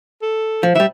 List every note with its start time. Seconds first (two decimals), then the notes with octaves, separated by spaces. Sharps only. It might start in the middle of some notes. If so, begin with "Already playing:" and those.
0.22 A4
0.63 F3
0.75 E3 G3 E5